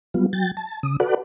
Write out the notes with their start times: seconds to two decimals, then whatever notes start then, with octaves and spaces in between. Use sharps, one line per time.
0.14 F#3 G3 B3 F4
0.33 F#3 G5 A6
0.57 A5
0.83 C#3 D#6
1.00 F#4 A4 B4 D5 F#5